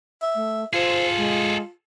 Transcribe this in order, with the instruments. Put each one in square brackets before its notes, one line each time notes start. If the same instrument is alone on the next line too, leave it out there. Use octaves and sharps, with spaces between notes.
[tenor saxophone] E5
[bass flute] A3
[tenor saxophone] F4 [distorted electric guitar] G#4 A4 [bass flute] C5
[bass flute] G#3